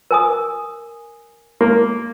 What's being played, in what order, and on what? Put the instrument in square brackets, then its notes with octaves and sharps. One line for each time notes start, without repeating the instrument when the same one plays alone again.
[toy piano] A#4 G#5 D#6
[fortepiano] A#3